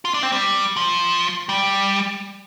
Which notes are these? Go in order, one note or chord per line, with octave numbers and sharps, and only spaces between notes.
F4
D4
C4
G3
F3
G3